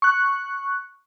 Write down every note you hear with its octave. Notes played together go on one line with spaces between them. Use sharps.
C#6 F#6